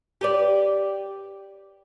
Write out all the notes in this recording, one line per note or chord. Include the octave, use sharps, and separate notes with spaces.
G4 B4 D5